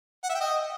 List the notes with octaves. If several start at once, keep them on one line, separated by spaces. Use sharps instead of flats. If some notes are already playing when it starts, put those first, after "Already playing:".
F#5
E5
G5
D#5